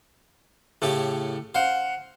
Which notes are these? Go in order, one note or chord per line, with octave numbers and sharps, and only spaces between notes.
A2 C#3 G4 A4
C5 F5 F#5